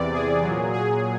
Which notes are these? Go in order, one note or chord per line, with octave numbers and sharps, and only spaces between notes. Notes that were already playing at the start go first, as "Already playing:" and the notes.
Already playing: E2 C3 E3 D5
G#4
A#2 F#3
G#4